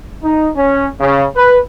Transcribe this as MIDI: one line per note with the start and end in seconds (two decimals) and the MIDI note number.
0.23 0.49 63
0.57 0.88 61
1.00 1.25 49
1.36 1.59 71